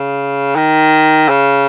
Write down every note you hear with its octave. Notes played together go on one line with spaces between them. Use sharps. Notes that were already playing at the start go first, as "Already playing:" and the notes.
Already playing: C#3
D#3
C#3